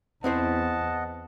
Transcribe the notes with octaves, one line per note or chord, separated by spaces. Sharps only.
E2 C4 E4 C5 D#5 F#5 A5